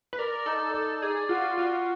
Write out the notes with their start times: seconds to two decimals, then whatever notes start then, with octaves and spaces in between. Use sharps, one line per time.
0.13 B4
0.19 A#4 D5
0.46 D#4 A4
0.74 A4 D5
1.02 G#4 D5
1.29 F4 F#4
1.57 F4 F#4